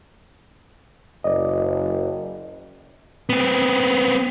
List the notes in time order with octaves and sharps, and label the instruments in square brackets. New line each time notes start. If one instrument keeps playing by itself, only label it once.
[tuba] F#1 [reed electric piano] D5 D#5
[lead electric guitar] B3 C4